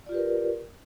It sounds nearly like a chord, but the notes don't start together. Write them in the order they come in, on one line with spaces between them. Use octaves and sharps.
D5 F4 G4 B4 A#4